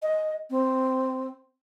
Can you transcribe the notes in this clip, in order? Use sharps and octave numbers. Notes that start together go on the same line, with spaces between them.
D#5
C4